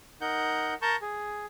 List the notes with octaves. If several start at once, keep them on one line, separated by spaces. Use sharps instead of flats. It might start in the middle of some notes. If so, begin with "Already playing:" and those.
D#4 A#4 F#5 G6
A#4 A5 A#5 C#6 G6
G#4